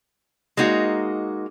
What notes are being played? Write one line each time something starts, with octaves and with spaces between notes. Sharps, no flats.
G#3 A#3 D#4 F#4